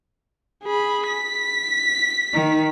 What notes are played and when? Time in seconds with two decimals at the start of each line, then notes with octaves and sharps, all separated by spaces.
0.64 G#4 B5
1.07 B6
2.33 D#3